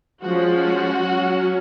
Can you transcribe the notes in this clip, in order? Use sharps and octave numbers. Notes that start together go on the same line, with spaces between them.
F3 G#3 C#4 F#4
F#3 C#4